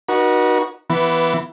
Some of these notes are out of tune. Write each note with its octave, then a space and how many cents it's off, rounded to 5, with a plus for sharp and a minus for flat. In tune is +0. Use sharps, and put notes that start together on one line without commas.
D#4 -25 F#4 +0 B4 -45
E3 +15 B3 +0